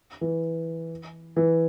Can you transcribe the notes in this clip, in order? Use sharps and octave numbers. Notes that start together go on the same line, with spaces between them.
E3
E3